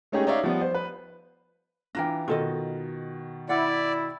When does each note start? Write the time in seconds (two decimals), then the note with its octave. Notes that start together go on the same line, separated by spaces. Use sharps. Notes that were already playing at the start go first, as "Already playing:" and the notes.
0.12 G#3 A3 C#4 D#4 G4 G#4
0.27 D#4 C#5 D5 E5 F5
0.44 F3 G3 B3
0.61 C5
0.75 B4
1.95 E3 D4 F4 G5 A#5 A#6
2.28 B2 D#3 F4 A4 D#5
3.49 E4 D5 F#5